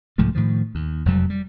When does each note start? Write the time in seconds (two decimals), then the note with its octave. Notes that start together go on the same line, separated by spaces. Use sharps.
0.18 C2 G#2 F3 A3
0.35 A2 D#3 F3
0.75 D#2
1.06 F1 F2 F#3 G3
1.30 G3